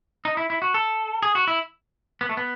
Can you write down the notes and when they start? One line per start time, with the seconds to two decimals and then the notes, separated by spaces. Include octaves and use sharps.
0.25 D#4
0.37 E4
0.50 E4
0.62 F#4
0.74 A4
1.23 G#4
1.35 F#4
1.47 E4
2.21 B3
2.29 A3
2.37 B3